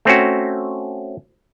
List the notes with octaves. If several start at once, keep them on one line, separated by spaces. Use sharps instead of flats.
A3 C4 C#4 F#4